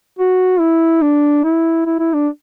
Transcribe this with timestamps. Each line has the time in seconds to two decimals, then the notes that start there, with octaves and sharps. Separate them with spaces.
0.19 F#4
0.60 E4
1.02 D4
1.44 E4
1.86 E4
1.99 E4
2.13 D4